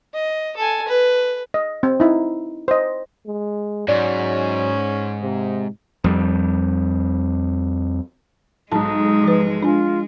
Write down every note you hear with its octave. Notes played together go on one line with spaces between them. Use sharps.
D#5
A4 G#5
B4
D#5
C4
D#4 E4
C5 D#5
G#3
G#2 F#3 C#4 D5
C3
F2 G3
B1 G#2 G#3 D#4 A5 A#5
F3 B4
D4 F4 G#5